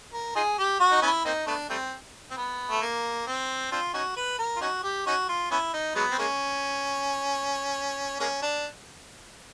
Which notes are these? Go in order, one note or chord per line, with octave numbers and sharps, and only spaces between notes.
A#4
D#4 F4 G#4
G4
F#4
D#4
B3 C#4 E4
A#3 C4 D#4
A3 B3 D4
G3 A3 C4
C4
B3
A3
A#3
C4
C4 D4 F4
C#4 D#4 F#4
B4
A#4
F4
C#4 D#4 F#4
G4
C#4 D#4 F#4
F4
B3 C#4 E4
D#4
F#3 G#3 B3
C4
G#3 A#3 C#4
G#3 A#3 C#4
D4